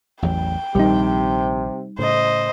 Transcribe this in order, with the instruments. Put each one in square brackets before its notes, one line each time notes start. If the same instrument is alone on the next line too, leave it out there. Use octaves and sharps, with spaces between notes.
[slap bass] A1 E2 F#3 [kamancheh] G5
[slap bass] A#1 D#3 [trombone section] C3 [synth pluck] G3 D#4
[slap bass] A2 C#3 [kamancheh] C5 D#5